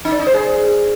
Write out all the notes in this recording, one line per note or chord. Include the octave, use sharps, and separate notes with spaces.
D#4
D5
D#4
C5
G#4